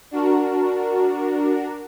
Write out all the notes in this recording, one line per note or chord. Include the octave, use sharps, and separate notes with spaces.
D4 F#4 A#4